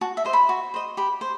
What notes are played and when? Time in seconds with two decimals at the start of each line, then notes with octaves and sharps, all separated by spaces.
0.01 F#4 A5
0.17 E5
0.25 C5 D#5
0.33 B5
0.49 F#4
0.74 C5 D#5
0.97 G4 B5
1.21 C5